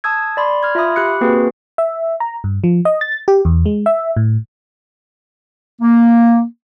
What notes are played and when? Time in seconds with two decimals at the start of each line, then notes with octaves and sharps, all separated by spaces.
0.04 A5 D#6 E6 G#6
0.37 D5 B5 C6
0.63 F6 G#6
0.75 F4 E5 A#5 B5 D#6
0.96 G4 B5 F#6 C#7
1.21 A#3 C4 F#4 G#4 B4
1.78 E5
2.20 A#5
2.44 G2
2.64 F3
2.85 D#5
3.01 A6
3.28 G4
3.45 E2
3.66 G#3
3.86 E5
4.17 A2
5.82 A#3